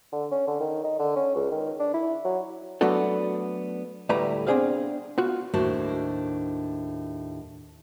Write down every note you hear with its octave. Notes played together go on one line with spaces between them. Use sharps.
D3
C#4
D3
D#3
D#4
D3
C#4
C#2
D#3
D4
E4
F#3
F#3 A3 B3 D4 F#4 A4
D2 A2 G3 A3 B4 A#5
B3 C4 D4 G#4 C5 F5
B3 F4 F#4
D#2 A2 D4 F#4 C5 A5